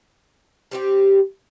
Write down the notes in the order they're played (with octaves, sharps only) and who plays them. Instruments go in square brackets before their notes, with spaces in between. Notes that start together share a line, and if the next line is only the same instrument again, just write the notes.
[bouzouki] G3 C4 E4 G4